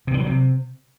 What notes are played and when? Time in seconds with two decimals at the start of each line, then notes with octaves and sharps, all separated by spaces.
0.07 C3
0.14 D3
0.20 F#3
0.26 C3